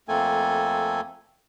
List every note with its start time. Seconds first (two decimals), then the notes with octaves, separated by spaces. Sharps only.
0.08 F2 A3 A#3 C4 A4 G#5